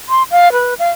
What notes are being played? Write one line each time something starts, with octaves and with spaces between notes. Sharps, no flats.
C6
F5
B4
F5